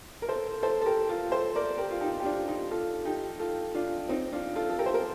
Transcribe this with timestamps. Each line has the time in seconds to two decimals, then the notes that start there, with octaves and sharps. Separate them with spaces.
0.22 A#4
0.28 A4 C5
0.63 A4 C5
0.81 A4
0.86 G4 A#4
1.09 F4 A4
1.32 A4 C5
1.55 A#4 D5
1.78 G4 A#4
1.91 F4
2.01 D#4 G4
2.20 G4
2.24 D4 F4
2.47 D#4 G4
2.70 F4 A4
3.05 D#4 G4
3.39 F4 A4
3.74 D4 F4
4.09 C4 D#4
4.32 D4 F4
4.56 F4 A4
4.70 A4
4.79 G4 A#4
4.86 C5
4.94 A#4